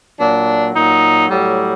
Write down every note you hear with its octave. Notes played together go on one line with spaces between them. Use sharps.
A#2 F#3 D4
A#2 F#3 D#4
A2 F#3 G3